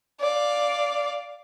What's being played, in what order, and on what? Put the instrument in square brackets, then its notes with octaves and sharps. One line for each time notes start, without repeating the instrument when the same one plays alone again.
[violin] D5 F5